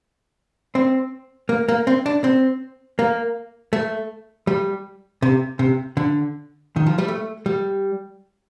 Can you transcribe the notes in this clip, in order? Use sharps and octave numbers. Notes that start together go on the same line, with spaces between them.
C4
A#3
A#3
C4
D4
C4
A#3
A3
G3
C3
C3
D3
D#3
F3
G3
A3
G3